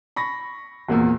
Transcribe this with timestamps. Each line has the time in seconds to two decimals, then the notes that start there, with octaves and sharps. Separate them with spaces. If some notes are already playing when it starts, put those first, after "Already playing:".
0.16 B5 C#6 A#6
0.89 G#1 E2 A#2 A#3 E6